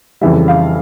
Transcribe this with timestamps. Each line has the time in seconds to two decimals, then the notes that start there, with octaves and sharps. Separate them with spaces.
0.21 F2 C#3 E3 G3 E5
0.48 F5